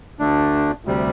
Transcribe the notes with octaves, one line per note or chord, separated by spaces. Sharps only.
D2 D3 A3 D4
D2 C3 G3